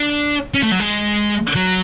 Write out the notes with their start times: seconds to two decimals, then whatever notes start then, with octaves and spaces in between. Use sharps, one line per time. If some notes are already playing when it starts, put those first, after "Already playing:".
Already playing: D4
0.54 C#4
0.63 A3
0.71 F#3
0.80 G#3
1.56 F#3